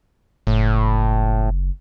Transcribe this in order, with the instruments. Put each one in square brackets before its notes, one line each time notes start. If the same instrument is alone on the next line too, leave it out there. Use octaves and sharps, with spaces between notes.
[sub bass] F#1 [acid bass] A2